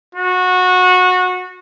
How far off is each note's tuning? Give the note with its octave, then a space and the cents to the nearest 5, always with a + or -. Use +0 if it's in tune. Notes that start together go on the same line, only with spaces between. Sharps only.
F#4 -20